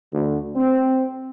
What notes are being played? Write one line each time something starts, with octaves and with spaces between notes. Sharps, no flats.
D2
C4